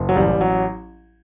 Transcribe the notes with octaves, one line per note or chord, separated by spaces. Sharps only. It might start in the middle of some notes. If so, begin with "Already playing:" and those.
Already playing: F#1
F#3
A1 G3
F#3